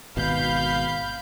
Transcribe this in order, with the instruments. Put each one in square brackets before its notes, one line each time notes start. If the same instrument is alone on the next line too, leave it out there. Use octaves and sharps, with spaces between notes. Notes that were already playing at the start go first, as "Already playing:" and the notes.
[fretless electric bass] G#1 B2 [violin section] F5 B5 G6